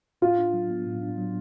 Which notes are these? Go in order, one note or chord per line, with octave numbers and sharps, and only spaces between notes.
A2 F4
D4
F#3
B3
A2
D4
F#3